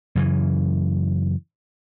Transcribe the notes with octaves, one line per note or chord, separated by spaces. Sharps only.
F#2 C#3 E3